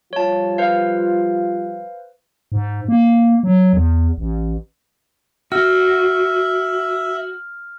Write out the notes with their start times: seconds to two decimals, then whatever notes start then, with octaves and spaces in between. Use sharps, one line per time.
0.13 F3 G3 F4 C#5 A5
0.58 B4 C5 F5
2.52 G#2
2.88 A#3
3.43 F#3
3.73 E2
4.18 A1
5.52 F#4 E5 F6